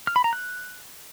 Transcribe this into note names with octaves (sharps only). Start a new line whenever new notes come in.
F6
B5
A#5
F#6